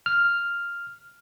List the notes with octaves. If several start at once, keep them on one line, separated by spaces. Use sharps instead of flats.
F6